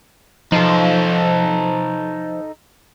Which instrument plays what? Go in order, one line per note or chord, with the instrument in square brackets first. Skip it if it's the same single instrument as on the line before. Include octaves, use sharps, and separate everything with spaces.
[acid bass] F3 [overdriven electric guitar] D#4 A4